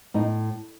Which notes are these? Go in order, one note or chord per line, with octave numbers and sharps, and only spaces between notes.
A2 D#4